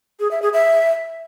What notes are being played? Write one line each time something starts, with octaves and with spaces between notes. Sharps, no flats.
G#4
E5
G#4
E5